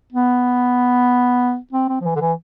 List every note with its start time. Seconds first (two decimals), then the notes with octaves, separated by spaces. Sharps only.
0.13 B3
1.73 C4
1.89 C4
2.01 F3
2.05 E3
2.16 D3
2.21 E3